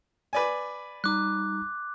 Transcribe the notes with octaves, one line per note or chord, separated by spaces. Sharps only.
B4 D5 G#5
G3 D#4 A#5 D6 F#6